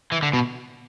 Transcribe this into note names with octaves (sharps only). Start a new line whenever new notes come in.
E3
D3
B2